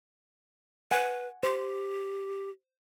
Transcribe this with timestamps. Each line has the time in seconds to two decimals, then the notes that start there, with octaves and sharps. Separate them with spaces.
0.91 B4 F#5 G#5
1.43 G4 C5